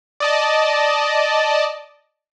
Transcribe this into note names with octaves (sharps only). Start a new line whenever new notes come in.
D5 D#5 A5